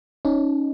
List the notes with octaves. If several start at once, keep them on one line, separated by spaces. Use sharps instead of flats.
C#4 D#4